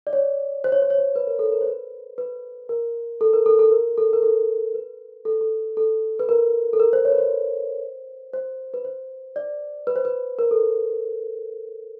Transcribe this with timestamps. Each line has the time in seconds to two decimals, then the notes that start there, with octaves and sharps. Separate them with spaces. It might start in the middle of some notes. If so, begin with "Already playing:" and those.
0.07 D5
0.13 C#5
0.64 C5
0.72 C#5
0.82 C5
0.90 C#5
0.98 C5
1.16 B4
1.27 A#4
1.39 A4
1.52 A#4
1.61 C5
1.67 B4
2.18 B4
2.69 A#4
3.21 A4
3.33 A#4
3.46 A4
3.59 A4
3.72 A#4
3.98 A4
4.13 A#4
4.23 A4
4.74 B4
5.25 A4
5.41 A4
5.77 A4
6.20 B4
6.29 A#4
6.73 A4
6.80 A#4
6.93 C5
7.05 C#5
7.12 B4
7.18 C5
8.33 C5
8.74 B4
8.85 C5
9.36 D5
9.87 B4
9.96 C5
10.05 B4
10.39 A#4
10.51 A4